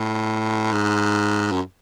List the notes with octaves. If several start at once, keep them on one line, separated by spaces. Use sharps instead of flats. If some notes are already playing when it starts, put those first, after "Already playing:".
Already playing: A2
G#2
F#2